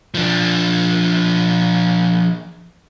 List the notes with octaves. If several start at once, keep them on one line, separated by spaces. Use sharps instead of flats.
F3 D4